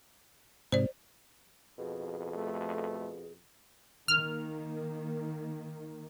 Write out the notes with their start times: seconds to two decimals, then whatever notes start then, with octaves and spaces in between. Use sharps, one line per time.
0.72 G#2 C3 C5 D5
1.78 F2 B2 G#4
2.36 A3
4.08 D#3 A#3 F6